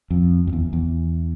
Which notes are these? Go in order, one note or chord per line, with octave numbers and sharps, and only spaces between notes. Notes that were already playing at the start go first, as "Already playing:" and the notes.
F2
F2
E2
E2